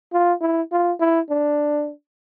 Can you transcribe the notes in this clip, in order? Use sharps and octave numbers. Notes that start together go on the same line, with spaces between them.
F4
E4
F4
E4
D4